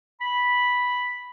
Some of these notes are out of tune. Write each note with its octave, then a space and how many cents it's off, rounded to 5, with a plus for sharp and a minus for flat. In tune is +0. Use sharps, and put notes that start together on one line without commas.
B5 -5